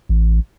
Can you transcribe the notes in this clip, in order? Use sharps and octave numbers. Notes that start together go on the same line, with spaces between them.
A1